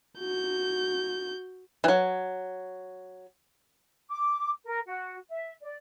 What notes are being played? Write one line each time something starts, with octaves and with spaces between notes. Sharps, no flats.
F#4 G6
E3 F#3
D6
A#4
F#4
E5
D5